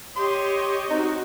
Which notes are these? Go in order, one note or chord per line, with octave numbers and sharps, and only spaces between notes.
G4 C#5 D#5 C6
C4 D#4 F#4